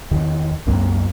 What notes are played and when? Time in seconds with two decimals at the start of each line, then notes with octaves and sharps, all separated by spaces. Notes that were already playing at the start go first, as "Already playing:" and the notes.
0.11 E2 D#3
0.66 C2 F#2 A#3